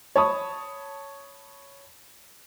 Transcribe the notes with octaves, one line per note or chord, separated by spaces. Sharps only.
C#5 A5 B5 C#6 D#6